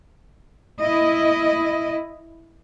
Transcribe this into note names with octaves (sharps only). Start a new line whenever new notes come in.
E4 D#5